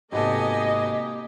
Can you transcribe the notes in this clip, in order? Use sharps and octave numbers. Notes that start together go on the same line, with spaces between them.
G#1 C3 A#3 B3 G4 A4 D#5 G#5